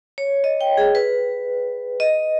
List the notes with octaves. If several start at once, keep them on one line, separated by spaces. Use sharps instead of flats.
C#5
D#5
G5
G#4
B4
D#5